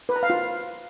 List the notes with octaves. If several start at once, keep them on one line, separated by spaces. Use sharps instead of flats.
B4
A#5
F5
F4